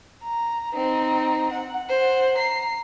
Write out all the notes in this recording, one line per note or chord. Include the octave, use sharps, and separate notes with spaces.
A#5
C4 D#4
F#5
C5 F#5
A#5 C7